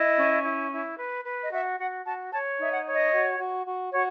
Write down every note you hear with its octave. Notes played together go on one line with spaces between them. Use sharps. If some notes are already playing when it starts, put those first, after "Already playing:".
Already playing: E4 D#5
C#4
E4
E4
B4
B4
D#5
F#4 E5
F#4 F#5
F#4 A5
C#5 A5
D#4 E5
F#5
C#5
D#5
F#4
F#4
F#4
F#4 C#5